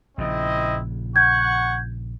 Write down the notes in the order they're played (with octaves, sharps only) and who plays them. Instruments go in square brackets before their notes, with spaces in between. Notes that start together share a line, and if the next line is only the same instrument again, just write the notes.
[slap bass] A#1 A#2 C#3 [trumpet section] C4 E4 D#5
[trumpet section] F#5 C#6 [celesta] G6 G#6